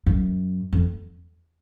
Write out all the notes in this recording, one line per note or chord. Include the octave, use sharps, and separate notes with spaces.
F#2
F2